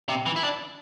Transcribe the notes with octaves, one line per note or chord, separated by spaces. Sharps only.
C3
E3
E4
D4